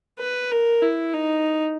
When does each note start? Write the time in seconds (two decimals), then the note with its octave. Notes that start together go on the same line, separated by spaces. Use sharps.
0.19 B4
0.51 A#4
0.82 E4
1.14 D#4